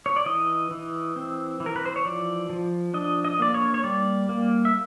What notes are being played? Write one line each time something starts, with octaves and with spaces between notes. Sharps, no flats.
C#5
D5
E3 D#5
E3
C4
E3
A#4
B4
C5
C#5
F3 D5
F3
D4 D#5
D#5
A#3 D5
C#5
C#5
G3 D5
A#3
E5